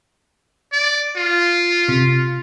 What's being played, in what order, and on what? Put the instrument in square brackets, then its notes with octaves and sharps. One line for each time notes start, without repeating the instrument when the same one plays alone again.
[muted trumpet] D5
F4
[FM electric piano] C3